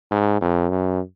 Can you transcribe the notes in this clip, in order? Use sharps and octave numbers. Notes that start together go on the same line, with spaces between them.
G#2
F2
F#2